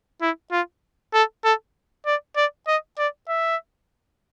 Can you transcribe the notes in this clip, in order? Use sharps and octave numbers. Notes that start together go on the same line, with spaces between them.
E4
F4
A4
A4
D5
D5
D#5
D5
E5